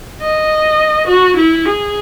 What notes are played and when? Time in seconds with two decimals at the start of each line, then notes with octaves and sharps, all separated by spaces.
0.22 D#5
1.08 F#4
1.37 E4
1.66 G#4